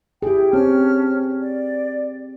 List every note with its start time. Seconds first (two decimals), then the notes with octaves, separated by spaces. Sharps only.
0.22 E4 G4 G#4 G5
0.53 C4 C#4 A5 F6
1.41 D5